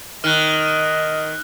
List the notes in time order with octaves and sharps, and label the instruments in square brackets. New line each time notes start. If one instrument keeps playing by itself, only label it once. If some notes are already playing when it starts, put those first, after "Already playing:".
[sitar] D#3 [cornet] D#5 [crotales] F6 F#6